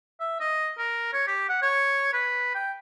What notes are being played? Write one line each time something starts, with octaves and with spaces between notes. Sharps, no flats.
E5
D#5
A#4
C#5
G4
F#5
C#5
B4
G5